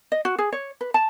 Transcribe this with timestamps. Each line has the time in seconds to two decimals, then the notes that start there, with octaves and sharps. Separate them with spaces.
0.12 D#5
0.25 F#4
0.39 G#4
0.52 C#5
0.81 B4
0.94 A5